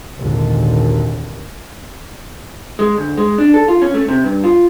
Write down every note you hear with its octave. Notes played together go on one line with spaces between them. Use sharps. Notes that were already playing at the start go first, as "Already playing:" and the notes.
G#1 D#2 A#2 D3
G#3
D2
G#3
D4
A4
F4
C#4
A3
C3
G2
F4